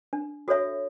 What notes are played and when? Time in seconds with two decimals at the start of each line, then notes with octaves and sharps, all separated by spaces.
0.13 D4
0.48 F#4 A4 C#5 E5